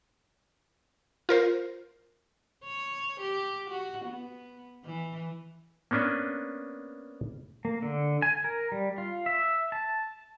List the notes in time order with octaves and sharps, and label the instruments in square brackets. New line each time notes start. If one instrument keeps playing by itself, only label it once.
[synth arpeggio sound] F4 A#4 C5
[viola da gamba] C#5
G4
F#4
B3
E3
[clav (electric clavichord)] A#3 B3 C#4 D4 B4
[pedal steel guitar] A#3
D3
G#5
A#4
G3
F4
E5
A5